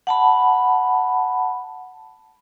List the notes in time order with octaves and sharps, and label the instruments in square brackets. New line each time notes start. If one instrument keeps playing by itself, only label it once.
[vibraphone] F#5 A5 B5